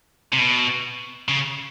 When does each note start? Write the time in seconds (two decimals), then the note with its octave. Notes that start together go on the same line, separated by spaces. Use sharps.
0.33 C3
0.38 B2
1.29 C#3